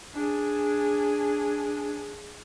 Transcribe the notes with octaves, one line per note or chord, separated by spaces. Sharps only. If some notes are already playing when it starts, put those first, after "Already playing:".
D4 G#4